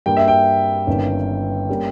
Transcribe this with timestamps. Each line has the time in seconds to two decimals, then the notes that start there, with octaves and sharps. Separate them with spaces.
0.06 G2 G3 A#3 G5
0.17 E5
0.28 G5
0.87 G1 G2 D#3 A#3 C#4
1.69 G3 A#3 C#4